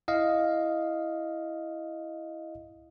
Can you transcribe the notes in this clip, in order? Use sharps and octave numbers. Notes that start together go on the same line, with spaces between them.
E4 D#5 F5